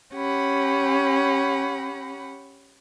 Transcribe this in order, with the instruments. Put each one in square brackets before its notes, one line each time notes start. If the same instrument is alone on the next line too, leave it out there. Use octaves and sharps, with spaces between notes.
[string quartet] C#4 G4 F#5 B5